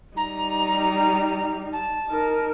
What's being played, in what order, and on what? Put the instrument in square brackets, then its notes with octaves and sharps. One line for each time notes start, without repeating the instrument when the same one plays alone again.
[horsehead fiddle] G3 D#4 [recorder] A#5
[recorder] A5
[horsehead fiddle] D#4 A#4